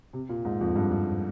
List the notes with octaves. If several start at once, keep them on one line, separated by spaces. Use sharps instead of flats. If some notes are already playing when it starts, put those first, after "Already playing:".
C3
A#2
G#2
F2
G2
G2